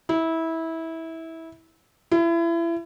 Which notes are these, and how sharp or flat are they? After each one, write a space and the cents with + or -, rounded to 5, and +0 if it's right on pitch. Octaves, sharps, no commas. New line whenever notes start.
E4 -20
E4 +30